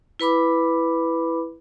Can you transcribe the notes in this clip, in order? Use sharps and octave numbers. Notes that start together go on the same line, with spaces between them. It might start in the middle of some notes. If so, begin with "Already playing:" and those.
E4 B4 B5 D6